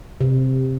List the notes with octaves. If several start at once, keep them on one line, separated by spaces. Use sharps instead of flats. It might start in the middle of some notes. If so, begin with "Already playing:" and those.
C3